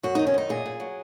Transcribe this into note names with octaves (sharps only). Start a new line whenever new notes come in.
F#2 F#4
D#3 D#4
C#4
F#2 D#4
A#2 G#4
A#2
F#3